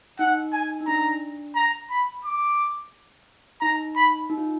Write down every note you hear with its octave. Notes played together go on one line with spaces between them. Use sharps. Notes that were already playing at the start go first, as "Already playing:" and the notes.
D#4 F#5
G#5
D#4
D4 A#5
A#5
B5
D6
D#4 A#5
B5
D#4
F4